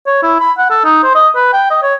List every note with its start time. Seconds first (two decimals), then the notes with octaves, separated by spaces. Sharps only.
0.07 C#5
0.23 E4
0.40 B5
0.58 F#5
0.70 A4
0.84 D#4
1.04 C5
1.15 D#5
1.36 B4
1.53 G5
1.70 D#5
1.83 C#5